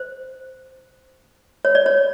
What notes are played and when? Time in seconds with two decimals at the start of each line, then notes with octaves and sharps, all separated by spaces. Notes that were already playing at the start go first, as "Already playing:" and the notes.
Already playing: C5
1.65 C#5
1.75 D5
1.86 C#5